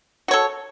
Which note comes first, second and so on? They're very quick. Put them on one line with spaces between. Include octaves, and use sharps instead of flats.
F#4 C#5 A4